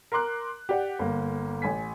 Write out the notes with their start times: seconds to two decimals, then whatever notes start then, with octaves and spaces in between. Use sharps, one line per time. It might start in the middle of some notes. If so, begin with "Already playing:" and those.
0.12 A#4 A#5 C6 D6 F#6
0.69 G4 D5 F#5
0.99 G1 A#3
1.62 A1 G#5 B6